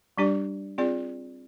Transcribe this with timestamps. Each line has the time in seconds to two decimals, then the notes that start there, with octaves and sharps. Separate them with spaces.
0.18 G3 D4 G4 D5
0.78 C4 F4 G#4 D5